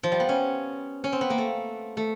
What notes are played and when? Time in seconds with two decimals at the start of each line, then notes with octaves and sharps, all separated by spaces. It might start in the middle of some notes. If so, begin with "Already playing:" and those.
0.03 F3
0.12 G3
0.20 B3
0.29 C#4
1.04 C#4
1.12 C4
1.21 B3
1.30 A#3
1.38 A3
1.97 A3